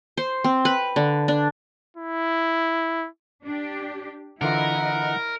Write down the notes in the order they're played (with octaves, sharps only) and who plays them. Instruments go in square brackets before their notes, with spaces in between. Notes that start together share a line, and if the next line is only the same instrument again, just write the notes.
[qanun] C5
C4
B4
D3
D4
[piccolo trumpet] E4
[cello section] D4 G4
[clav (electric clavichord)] D3 E3 F4 [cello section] E4 D#5 [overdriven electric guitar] A#4 [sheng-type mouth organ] F#5